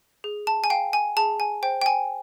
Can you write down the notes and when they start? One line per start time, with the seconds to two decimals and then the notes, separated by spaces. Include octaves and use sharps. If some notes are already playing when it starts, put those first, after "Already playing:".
0.24 G#4
0.47 A5
0.64 G#5
0.70 F5 G5
0.93 G#5
1.17 G#4 A5
1.40 G#5
1.63 C5 G5
1.81 G5
1.86 G#5